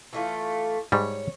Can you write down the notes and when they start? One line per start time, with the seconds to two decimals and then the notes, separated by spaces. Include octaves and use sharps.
0.13 E3 A3 F4
0.92 G#2 G3 C#5